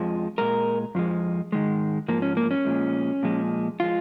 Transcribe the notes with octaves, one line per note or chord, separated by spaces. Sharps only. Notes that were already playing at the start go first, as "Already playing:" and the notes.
Already playing: F2 F3 G#3
A#2 G#3 A#4
F2 F3 G#3
G#2 D#3 G#3
G#2 F3 A#3
C#4
A#3
C#4
A#2 F3 G#3
A#2 F3 G#3
F3 G#3 F4